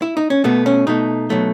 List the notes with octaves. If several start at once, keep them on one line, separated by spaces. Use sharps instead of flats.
E4
D#4
C#4
B2 A3 B3
C#4
B2 A3 D#4
B2 F#3 A3